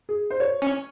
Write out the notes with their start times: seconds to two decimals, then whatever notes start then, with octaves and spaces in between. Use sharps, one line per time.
0.09 G#4
0.30 C5
0.40 C#5
0.62 C#4